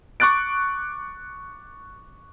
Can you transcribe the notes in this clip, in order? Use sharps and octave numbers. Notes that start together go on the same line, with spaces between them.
C#6 D6 F#6 A6 D7